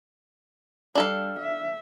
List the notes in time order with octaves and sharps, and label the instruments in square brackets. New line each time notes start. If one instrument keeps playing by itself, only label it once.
[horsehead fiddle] G3 [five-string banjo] D4 A4 F5
[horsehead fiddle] E5